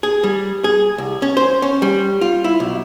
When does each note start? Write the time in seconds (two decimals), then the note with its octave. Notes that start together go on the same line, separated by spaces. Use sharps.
0.03 G#4
0.24 G3
0.64 G#4
0.98 C2
1.22 C#4
1.37 C5
1.62 C#4
1.82 G3
2.21 F4
2.44 E4
2.60 B1